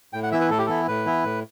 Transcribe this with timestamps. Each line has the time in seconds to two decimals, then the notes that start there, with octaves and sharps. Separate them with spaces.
0.13 A2 G5
0.23 F#5
0.32 E3 B3 E4 E5
0.41 B4
0.50 A2 A4
0.58 G4
0.66 E3 B3 E4 A4
0.88 A2 B4
1.06 E3 B3 E4
1.25 A2